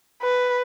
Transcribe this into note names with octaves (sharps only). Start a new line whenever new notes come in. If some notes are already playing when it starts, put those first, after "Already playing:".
B4